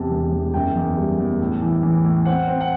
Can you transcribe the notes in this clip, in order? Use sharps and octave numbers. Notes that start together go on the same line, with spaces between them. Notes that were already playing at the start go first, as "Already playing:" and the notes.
Already playing: E2 C3 A5
E1
E2
F#1 G5
E2
G3
E2
A2
E3
E3
A2
C4 F#5
C4
F#5